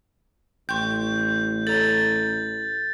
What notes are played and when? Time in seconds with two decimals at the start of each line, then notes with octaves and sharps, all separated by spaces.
0.69 A1 G5 C6 C#6 G6
1.67 A4 C#5 A#5 A6